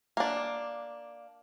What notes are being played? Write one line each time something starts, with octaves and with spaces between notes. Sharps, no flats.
A#3 D4